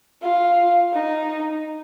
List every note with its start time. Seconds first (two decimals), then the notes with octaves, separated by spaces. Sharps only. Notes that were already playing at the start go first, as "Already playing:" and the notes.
0.22 F4
0.93 D#4